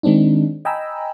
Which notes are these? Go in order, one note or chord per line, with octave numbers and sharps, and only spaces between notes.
D#3 G#3 C4 D4 D#4
D#5 G5 G#5 A#5 B5 E6